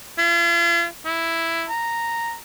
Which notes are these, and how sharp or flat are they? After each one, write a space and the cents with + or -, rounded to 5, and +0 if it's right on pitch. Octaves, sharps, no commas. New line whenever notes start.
F4 -45
E4 +5
A#5 -5